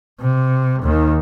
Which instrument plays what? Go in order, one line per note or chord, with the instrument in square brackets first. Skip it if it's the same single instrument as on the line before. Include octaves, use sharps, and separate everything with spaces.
[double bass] C3
D#2 D#3